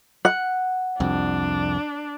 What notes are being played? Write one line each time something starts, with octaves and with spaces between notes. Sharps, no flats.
F#5
C2 F2 D4